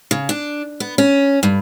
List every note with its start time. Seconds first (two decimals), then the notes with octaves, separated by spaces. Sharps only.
0.11 C#3
0.29 D4
0.80 B3
0.98 C#4
1.43 G2